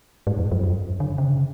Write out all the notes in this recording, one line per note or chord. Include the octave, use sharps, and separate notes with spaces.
G#2
F2
F#2
F#2
D3
C#3